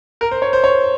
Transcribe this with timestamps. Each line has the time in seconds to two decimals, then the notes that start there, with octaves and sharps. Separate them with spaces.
0.21 A#4
0.31 C5
0.42 C#5
0.53 C5
0.64 C#5